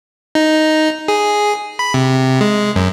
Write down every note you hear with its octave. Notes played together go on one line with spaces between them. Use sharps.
D#4
G#4
B5
C3
G#3
F#2